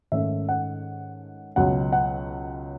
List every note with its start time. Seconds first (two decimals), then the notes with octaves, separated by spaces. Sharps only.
0.12 G#2 D#3 A3 C#4 E5
0.49 F#5
1.56 C#2 B2 F#3 F#5
1.92 F#5